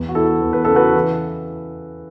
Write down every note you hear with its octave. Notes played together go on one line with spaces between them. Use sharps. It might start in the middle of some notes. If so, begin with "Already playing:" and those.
Already playing: E2
F#4
E2 E4 A4
E2
B4
C#3 A4
F#4 B4
E3